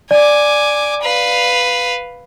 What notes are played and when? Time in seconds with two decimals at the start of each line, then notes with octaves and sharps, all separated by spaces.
0.11 D5 G#5 D6
1.02 B4 F5